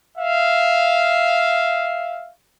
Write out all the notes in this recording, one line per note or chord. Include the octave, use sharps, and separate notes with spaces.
E5 F5